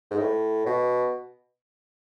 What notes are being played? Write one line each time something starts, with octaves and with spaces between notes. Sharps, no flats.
G#2
A2
B2